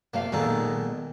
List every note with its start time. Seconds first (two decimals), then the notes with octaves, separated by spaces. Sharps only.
0.14 C3 A3 A#3 F5
0.32 B1 A#2 D#3 G#3 A4